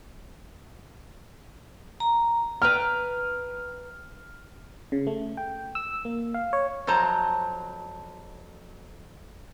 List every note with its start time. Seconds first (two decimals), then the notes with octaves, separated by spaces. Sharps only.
2.00 A#5
2.62 B4 G5 A#5 F6
4.92 C#3
5.07 A3
5.37 G5
5.75 E6
6.05 A#3
6.34 F5
6.53 C#5
6.87 F2 F#3 C5 A5 A#5